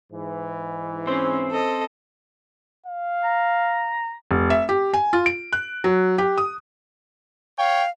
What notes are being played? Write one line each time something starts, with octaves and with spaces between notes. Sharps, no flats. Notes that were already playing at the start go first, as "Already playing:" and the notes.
G#2 E3
C4 C#4 C5
A4 D#5
F5
A#5
F1
E5
G4
G#5
F4
D7
F#6
F#3
G4
D#6
C#5 F5 G5